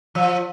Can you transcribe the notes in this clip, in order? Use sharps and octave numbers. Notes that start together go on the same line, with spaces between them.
F3